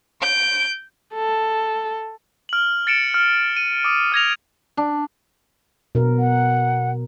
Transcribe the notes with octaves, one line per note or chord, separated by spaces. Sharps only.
G6 D7
A4
F6 F#7
A6 C#7 D7 E7
F6
D#7
D6 D#6
F6 G#6 A#6 F7
D4
B2 A#4
F#5